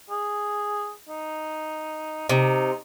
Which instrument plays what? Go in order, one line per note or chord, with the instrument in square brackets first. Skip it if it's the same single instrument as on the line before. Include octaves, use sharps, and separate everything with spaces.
[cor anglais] G#4
D#4
[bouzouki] C3 [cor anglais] D#4